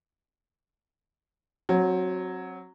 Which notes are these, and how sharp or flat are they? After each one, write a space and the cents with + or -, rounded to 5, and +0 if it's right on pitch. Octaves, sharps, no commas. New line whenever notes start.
F#3 +0 C4 +30